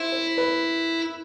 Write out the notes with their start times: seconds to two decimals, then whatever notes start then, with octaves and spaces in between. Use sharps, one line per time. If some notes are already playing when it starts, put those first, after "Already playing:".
Already playing: E4 C5
0.12 C5
0.38 B4